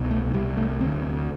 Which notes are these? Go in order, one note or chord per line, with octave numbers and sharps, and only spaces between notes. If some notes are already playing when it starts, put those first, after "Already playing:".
Already playing: C2 B2
A3
C2 C3 G3
A3
D2 D3 C4